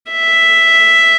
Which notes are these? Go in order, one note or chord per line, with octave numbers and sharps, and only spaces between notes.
E5